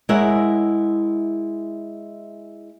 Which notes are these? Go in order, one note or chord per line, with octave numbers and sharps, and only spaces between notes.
G#3 E4 A#4 C#5 E5 F#5